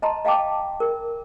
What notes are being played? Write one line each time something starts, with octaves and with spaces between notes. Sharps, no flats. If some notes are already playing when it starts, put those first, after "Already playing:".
D#5 A5 A#5 C6
D#5 F5 G5 A5 D6
A#4